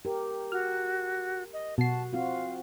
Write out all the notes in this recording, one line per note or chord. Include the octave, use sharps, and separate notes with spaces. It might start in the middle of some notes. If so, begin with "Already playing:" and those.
G4 A#4
F#4 F6
D#5
B2 F#4 A5 C7
C4 F4 F#4 F5